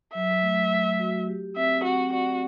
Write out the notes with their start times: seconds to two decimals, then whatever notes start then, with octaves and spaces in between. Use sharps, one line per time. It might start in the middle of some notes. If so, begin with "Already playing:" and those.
0.14 F#3 E5
0.42 A3
0.71 A3
0.99 F#4
1.27 G4
1.56 C4 E5
1.84 C4 F#4
2.12 F#4 D5